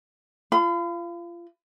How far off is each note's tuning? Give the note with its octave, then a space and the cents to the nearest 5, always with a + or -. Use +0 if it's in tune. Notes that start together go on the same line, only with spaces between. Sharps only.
F4 -25 B5 +40